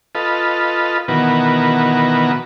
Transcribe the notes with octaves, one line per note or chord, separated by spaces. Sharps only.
F4 A4 B4 D#5
B2 D#3 E3 B3 F#4 A#4